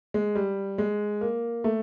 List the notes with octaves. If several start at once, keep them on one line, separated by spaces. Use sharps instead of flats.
G#3
G3
G#3
A#3
A3